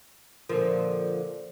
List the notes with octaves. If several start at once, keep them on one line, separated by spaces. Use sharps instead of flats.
A#2 D3 F3 A#4